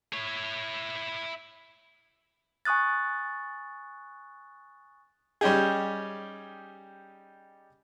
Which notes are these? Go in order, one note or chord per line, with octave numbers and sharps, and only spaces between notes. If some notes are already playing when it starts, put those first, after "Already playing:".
E4 C#5
G#5 C#6 D#6 F#6 A6
G3 C#4 D#4 G4 G#4